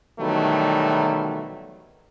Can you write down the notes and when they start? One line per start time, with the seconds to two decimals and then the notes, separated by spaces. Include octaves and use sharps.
0.20 B2 D#3 E3 F#3 G3 A3